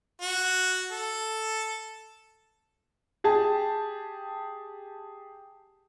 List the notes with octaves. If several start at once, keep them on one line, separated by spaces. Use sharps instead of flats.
F#4
A4
G4 G#4 A5